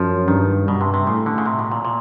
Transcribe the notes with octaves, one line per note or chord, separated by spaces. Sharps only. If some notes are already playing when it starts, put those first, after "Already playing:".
Already playing: F#2 F3
G2 D#3
G2 B2
C3
C3
A2 C#3
D3
C#3
C3
B2
A#2
A#2